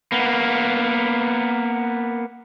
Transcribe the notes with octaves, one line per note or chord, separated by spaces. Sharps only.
A#3 B3